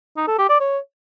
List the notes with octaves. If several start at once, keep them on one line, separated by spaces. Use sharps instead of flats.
D#4
A4
G4
D5
C#5